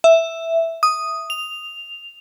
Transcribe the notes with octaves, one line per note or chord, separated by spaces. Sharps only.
E5
D#6
F7